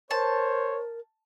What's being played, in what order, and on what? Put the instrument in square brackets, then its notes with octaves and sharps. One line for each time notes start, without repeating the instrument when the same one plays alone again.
[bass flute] A#4 [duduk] C5 [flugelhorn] C#5 [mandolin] A5